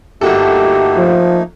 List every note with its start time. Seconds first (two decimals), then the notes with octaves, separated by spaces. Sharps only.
0.21 G1 A3 A#3 D#4 F#4 G4 A4
0.97 F3